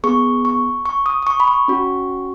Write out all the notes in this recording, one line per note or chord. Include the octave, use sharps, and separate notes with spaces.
B3 G#4 C#6
C#6
C#6
D#6
D#6
C#6
B5
C#6
C#4 F#4